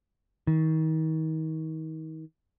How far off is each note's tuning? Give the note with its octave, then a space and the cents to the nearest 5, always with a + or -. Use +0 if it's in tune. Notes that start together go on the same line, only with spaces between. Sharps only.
D#3 +35